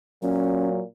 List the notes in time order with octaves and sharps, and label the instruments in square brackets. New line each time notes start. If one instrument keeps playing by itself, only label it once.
[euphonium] A#2 [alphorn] F#3 [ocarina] C#4